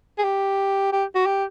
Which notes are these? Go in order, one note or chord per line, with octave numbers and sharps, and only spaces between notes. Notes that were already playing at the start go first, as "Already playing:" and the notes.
G#4
G4
G4
F#4
G4